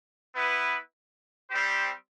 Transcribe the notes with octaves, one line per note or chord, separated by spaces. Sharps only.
B3 E4 B4
G3 C4 G4 C5